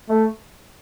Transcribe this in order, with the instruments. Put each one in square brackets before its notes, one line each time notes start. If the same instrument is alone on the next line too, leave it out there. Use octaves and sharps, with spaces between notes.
[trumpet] A3